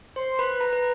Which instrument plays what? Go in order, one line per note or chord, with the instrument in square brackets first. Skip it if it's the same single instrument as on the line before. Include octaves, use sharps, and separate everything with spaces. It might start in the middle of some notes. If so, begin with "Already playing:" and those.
[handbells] C5 [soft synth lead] C6
[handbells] B4 [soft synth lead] B5
[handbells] B4 [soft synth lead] A#5
[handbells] B4